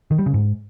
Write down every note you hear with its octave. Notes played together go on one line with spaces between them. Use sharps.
D#3
G3
C#3
G#2